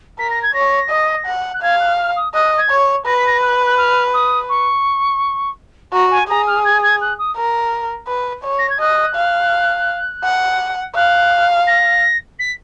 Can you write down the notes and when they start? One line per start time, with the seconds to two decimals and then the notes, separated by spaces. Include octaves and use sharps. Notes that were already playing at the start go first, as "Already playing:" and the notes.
0.19 A#4 B6
0.30 A#6
0.42 G#6
0.54 C#5 A#6
0.90 D#5
1.26 F#5
1.53 F#6
1.62 F5 G#6
1.79 F#6
1.98 F6
2.16 D#6
2.34 D#5 F#6
2.57 G#6
2.70 C#5
3.06 B4 A#6
3.16 B6
3.27 A#6
3.42 F#6
3.66 F#6
3.78 F6
4.13 D#6
4.49 C#6
5.93 F#4 A#5
6.11 G#5
6.28 G#4 A#5
6.47 F6
6.64 G#6
6.82 G#6
7.01 F#6
7.18 D#6
7.36 A#4
8.08 B4
8.44 C#5
8.58 A#6
8.69 G#6
8.80 D#5 F#6
9.15 F5
10.24 F#5
10.95 F5 F#6
11.67 A#6
12.39 B6